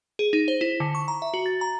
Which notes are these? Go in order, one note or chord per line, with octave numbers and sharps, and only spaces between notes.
G#4
D#4
C5
E4
D3
C#6
A#5
E5
F#4
A6
A#5